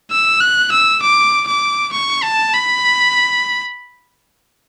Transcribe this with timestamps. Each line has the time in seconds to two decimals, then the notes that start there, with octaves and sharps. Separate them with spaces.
0.11 E6
0.40 F#6
0.72 E6
1.02 D6
1.47 D6
1.93 C#6
2.23 A5
2.53 B5